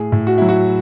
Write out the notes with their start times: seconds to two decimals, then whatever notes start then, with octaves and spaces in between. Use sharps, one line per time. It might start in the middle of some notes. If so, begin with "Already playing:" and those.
Already playing: A2 G#4
0.12 A2
0.27 F#4
0.38 F#3 E4
0.49 F#4